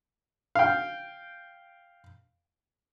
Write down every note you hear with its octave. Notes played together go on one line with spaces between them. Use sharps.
F5 G5